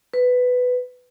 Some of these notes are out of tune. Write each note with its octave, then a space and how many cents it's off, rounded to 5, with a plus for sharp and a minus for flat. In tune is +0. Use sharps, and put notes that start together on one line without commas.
B4 +10